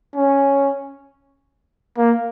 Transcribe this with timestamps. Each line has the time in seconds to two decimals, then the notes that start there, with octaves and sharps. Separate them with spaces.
0.16 C#4
1.97 A#3